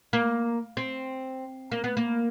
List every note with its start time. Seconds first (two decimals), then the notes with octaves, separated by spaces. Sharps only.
0.13 A#3
0.77 C4
1.72 A#3
1.84 B3
1.97 A#3